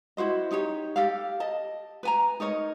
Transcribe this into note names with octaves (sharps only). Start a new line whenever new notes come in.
E4 F#4 C5 D#5
D#4 G4 C#5
G4 A4 F5
D#5 A5
B4 G#5 A#5
D#4 A#4 C#5 D#5